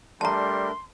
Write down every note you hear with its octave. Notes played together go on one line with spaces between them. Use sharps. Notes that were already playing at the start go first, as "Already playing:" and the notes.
G3 A3 D4 A#4 A5 A#5 C6